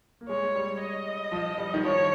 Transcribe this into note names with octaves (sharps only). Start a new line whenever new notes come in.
A#3
G#3 C#5
G3
D#5
F3
G3
D#3
F3 C#5